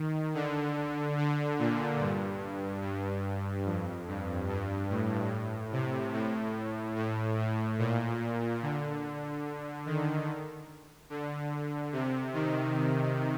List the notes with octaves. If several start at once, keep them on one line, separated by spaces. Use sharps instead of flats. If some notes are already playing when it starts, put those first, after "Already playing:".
Already playing: D#3
D3
D3
A#2
G2
G2
F2
G2
G2
A2
C3
A2
A2
A2
A#2
D3
D#3
D3
C3
D#3